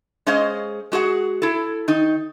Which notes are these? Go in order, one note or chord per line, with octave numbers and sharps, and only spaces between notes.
G#3 C#4 G#4 C5 D#5 F5
G#3 F#4 G#4 F#5
E4 A4
D#3 D#4